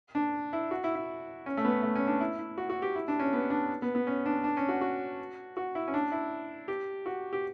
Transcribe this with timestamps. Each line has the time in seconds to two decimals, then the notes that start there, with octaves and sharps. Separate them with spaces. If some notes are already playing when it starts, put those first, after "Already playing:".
0.15 D4
0.53 E4
0.71 F#4
0.84 E4
0.95 E4
1.46 C#4
1.57 A3
1.65 B3
1.83 A3
1.96 C#4
2.07 D4
2.20 E4
2.39 E4
2.58 F#4
2.70 F#4
2.82 G4
2.95 E4
3.08 D4
3.20 C#4
3.33 B3
3.50 D4
3.82 B3
3.95 B3
4.07 C#4
4.26 D4
4.44 D4
4.57 C#4
4.69 F#4
4.81 F#4
5.57 F#4
5.75 E4
5.88 C#4
5.94 D4
6.12 E4
6.68 G4
7.06 F#4
7.33 G4